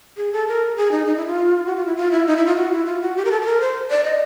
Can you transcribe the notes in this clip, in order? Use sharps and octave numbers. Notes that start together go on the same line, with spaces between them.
G#4
A4
A#4
G#4
D#4
D#4
E4
F4
F#4
F4
E4
F4
E4
D#4
E4
F4
F#4
E4
F4
F#4
G4
A#4
A4
A4
A#4
C5
D5
D#5